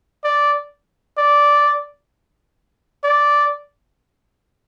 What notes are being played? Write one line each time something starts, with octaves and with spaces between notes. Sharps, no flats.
D5
D5
D5